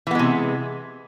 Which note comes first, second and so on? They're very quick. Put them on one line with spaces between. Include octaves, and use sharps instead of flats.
E3 B3 G#3 C3